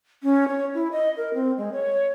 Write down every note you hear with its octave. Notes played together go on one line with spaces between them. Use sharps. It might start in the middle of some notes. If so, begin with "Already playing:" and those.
C#4
C#5
E4
D#5
A#4
C4
G#3
C#5